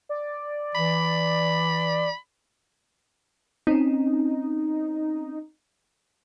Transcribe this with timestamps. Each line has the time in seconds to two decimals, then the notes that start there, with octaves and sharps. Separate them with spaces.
0.09 D5
0.75 E3 B5
3.67 C4 C#4 D#4